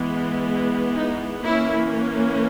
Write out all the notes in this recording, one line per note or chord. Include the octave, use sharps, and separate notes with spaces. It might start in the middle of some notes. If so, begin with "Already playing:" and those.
Already playing: E3 G#3 B3
D#4
E3 A#3 C#4 E4